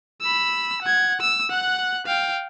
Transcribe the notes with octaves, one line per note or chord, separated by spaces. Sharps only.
B5 E6
F#5 G#6
E6
F#5 F#6
F5 G5